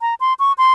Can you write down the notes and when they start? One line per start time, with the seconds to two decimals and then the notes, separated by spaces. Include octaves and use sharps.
0.01 A#5
0.20 C6
0.39 C#6
0.58 C6